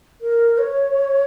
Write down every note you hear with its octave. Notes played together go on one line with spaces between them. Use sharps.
A#4
C#5